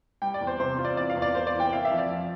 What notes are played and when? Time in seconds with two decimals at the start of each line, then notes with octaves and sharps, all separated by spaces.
0.22 G3 G5
0.34 D5
0.41 E2
0.47 C5
0.59 C3 C5
0.78 F4
0.85 D5
0.97 E3 D5
1.10 F5
1.16 E2
1.22 D5
1.35 A#3 C5
1.47 D5
1.54 E3
1.60 G5
1.72 E4 F5
1.85 E5
1.92 F3
1.98 D5
2.10 F2